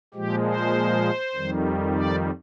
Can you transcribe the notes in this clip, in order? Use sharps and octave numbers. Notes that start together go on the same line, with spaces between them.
A#2 F3 G#3 G4
C5
F2 D#3 G3
D5